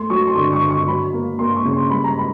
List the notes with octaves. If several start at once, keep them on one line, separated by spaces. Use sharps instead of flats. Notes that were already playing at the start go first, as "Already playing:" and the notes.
Already playing: A3 C6
F#3 C#6
C6
D3 C#6
C#6
D3
C#6
F#3 B5
A#3
A#3 C6
C#6
C#3
C6
G3 B5
A#5
B5